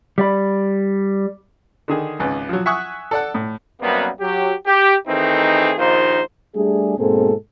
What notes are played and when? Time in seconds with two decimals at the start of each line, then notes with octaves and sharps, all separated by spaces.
0.18 G3 D5 B5
1.88 D3 D#3 G#4
2.19 G#1 C#2 B4
2.49 F3 F#3
2.66 E5 F#5 G#5 C#6 D#6 F#6
3.11 A4 D5 F#5
3.35 A2
3.81 F#2 C3 G3 A#3 B3
4.20 F#3 G4
4.66 G4
5.08 D#3 E3 A3 C4 D#4 G#4
5.77 A#1 D#2 D#3 D#4 F4 C5
6.55 G3 A3 D4 G#4
6.98 G#2 B2 A#3 C4 G#4 A4